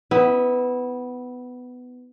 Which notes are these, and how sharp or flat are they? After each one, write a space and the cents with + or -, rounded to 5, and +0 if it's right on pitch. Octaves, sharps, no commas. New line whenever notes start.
B3 +15 E4 -15